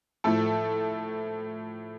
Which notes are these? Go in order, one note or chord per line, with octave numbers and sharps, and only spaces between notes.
A2 F3 A3 A4